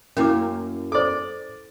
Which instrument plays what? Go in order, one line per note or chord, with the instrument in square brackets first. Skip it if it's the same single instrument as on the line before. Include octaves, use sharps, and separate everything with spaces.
[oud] F#2 A#3 [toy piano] C#4 E4 D6
[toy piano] A4 C5 [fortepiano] D5 D6